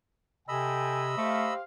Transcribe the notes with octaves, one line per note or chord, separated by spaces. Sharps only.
C3 A4 D#5 G5 G#5 B5 E6
A3 G4 C5 F5